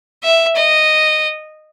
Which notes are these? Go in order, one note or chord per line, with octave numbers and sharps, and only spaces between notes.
E5
D#5